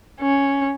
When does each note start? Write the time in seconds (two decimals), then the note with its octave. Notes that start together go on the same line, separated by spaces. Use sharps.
0.21 C#4